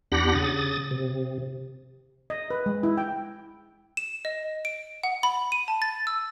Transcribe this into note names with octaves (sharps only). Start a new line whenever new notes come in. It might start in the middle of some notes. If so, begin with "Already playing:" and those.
E2 D4 G4 F#5 B5 A#6
C#3 D#6 A6
C3
D#5
B4
G#3
E4
G5
E7
D#5
D7
F#5
B5
D#7
A5
A6
E6